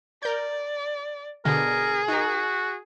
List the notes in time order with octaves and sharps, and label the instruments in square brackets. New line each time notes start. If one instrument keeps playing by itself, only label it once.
[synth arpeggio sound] A#4 G6 [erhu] D5
[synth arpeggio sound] B2 D3 [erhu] G#4 [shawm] A#4
[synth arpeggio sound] D#4 A#4 [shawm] F#4